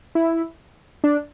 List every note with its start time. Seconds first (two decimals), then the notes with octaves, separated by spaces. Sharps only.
0.15 E4
1.04 D4